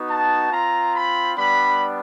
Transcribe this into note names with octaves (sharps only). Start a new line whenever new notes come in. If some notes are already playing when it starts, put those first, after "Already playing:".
Already playing: B3 D#4 F#4
A5
C4 F4 A#5
B5
G3 B3 D4 B5